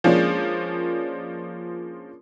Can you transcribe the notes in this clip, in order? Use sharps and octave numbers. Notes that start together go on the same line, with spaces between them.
F3 G#3 A#3 C#4 D4